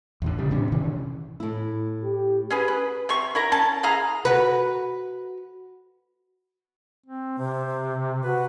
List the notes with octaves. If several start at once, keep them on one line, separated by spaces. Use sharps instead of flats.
E2 A#2 D3
C#3 G3
A1 A2 C3 D4
C3 D#3 E3 C#4
A2 E4
G4
C#4 G#4 B4
B4
C3 G4 C#6
E4 A#4 A#5
C#4 A5
E4 G#4 F5 A#5
F#4 B4
C4
C3 C5
F#4 B4